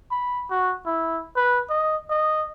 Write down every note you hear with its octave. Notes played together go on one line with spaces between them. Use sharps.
B5
F#4
E4
B4
D#5
D#5